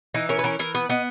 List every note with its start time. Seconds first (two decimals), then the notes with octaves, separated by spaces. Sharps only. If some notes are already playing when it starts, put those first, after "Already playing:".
0.14 E3 D#4
0.29 C#4 A#4
0.39 B4
0.44 E3 A#4
0.59 E3 A#4
0.75 B3 B4
0.90 B3 D#5